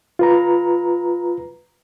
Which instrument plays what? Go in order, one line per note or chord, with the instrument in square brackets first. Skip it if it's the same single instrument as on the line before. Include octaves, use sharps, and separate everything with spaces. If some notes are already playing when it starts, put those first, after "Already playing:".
[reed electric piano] F4 B4 A#5